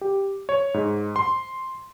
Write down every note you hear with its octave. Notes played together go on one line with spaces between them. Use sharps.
G4
C#5
G#2
C6